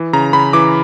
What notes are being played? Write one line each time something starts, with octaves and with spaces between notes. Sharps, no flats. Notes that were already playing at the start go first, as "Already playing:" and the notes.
Already playing: E3
C#3 A#5
C#3 B5
E3 D6